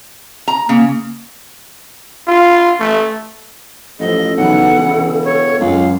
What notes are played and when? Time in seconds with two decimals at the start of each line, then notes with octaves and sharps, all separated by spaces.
0.48 A#5
0.69 C#3 A#3
2.27 F4
2.80 A3
4.00 A1 F3 A4 D#5
4.37 B1 C#3 E3 F#5
4.77 E1
5.24 C#5
5.60 C#2 F#2 F5